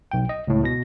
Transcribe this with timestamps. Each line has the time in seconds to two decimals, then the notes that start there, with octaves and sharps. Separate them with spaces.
0.11 B1 G5
0.29 D#5
0.47 C#2 A2
0.63 B2 A#6